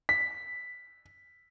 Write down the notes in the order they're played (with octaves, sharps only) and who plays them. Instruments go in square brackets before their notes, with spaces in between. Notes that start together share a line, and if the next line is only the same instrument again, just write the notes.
[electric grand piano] B6